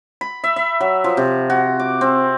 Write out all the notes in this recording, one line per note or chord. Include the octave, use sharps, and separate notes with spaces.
B5
E5
E5
F#3
F3
C3
F#4
D6
C4